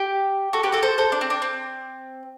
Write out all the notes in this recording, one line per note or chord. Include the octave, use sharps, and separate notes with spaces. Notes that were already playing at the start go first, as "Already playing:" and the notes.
Already playing: G4
F#4 A4
G4 B4
F#4 A4
A4 C5
A4 C5
D4
C4
D4
C4